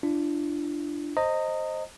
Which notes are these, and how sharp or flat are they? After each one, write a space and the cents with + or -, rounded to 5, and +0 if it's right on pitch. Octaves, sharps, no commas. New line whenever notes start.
D4 +0 F4 -45
C5 +10 D#5 +0 A#5 -35